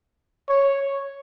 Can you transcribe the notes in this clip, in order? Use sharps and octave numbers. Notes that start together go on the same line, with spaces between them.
C#5